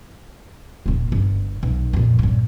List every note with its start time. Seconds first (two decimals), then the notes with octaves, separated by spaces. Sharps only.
0.86 D#1 A#3
1.12 G1
1.63 B1
1.93 F2 A#2
2.19 G2 A#2